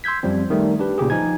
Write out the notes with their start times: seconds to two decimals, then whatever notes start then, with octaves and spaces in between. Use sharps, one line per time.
0.04 C6 E6 G6 G#6 B6
0.23 F#2 F3 G3 C4
0.50 D#3 G3 A3
0.79 D4 G4 B4
0.98 A#2 C#3 G4 G#4
1.10 F3 D#4 G#5 G#6